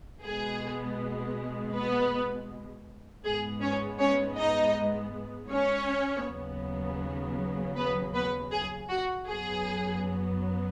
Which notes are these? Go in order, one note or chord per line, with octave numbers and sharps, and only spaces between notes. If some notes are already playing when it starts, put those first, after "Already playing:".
B2 G#3 B3 G#4
B3 B4
G#2 G#3 B3 G#4
C#4 C#5
C#4 C#5
D#4 D#5
C#4 C#5
D#2 C#3 F#3 B3
B3 B4
B3 B4
G#4
F#4
F#2 F#3 B3 G#4